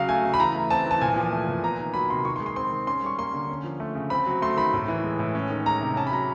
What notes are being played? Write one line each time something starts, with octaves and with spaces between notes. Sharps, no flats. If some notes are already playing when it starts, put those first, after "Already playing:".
Already playing: C#3 F#3 F5
A3 G#5
C#3
B5
E3 A#5
A3
C4 A5
E3 A5
A#2 G#5
F3
A3
A#2
B3 A#5
D#3
F#3 B5
C3 C6
D#3 C#6
C6
G#3
C6
C4 C6
D#3
C#4 C6
G3 C#6
A#3 C6
D3
C#4
F3
A3
C#3
C4 B5
F#3
A3 C6
D#3 B5
A2
E3
G#3
A2
C#4
D#3
G#3 A#5
C3
C#4 A5
B5
F#3 A#5